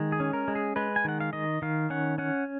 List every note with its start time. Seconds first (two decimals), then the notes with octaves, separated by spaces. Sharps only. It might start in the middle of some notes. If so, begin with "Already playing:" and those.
Already playing: D#3 G#3
0.12 G#4
0.20 C#4
0.33 A#4
0.48 G#3
0.55 G#4
0.76 G#3 B4
0.96 G#5
1.05 D#3 F#5
1.20 F5
1.33 D#3 D#5
1.62 D#3 F5
1.90 C#4 F#5
2.18 C#4 F#5